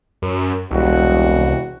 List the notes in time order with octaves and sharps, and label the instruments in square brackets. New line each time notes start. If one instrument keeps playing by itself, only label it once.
[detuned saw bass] F#2
[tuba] E1 [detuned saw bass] C2 [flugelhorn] F#4